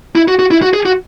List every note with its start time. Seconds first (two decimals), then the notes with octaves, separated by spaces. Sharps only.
0.15 E4
0.28 F#4
0.39 F#4
0.51 E4
0.62 F#4
0.74 G#4
0.86 F#4